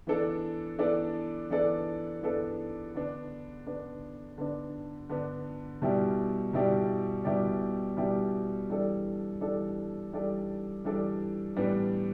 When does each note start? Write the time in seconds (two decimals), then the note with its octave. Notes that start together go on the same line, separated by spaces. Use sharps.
0.07 E3 B3 D4 A4 D5
0.79 E3 B3 D4 A4 D5
1.50 E3 B3 D4 A4 D5
2.22 E3 B3 D4 A4 D5
2.94 D3 B3 D4
3.66 D3 B3 D4
4.38 D3 B3 D4
5.09 D3 B3 D4
5.82 B2 G3 E4 G4 D5
6.53 B2 G3 E4 G4 D5
7.25 B2 G3 E4 G4 D5
7.97 B2 G3 E4 G4 D5
8.69 E3 G3 D4 A4 D5
9.41 E3 G3 D4 A4 D5
10.12 E3 G3 D4 A4 D5
10.84 E3 G3 D4 A4 D5
11.56 A2 E3 G3 B3 D4